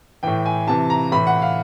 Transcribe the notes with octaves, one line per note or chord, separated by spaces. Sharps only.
A2 E3 G5
G#5
C3 E3 A5
A#5
A2 E3 B5
F#5
F5